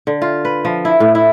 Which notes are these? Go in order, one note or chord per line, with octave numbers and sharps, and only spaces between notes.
D3
F4
B4
F3
E4
A2
E4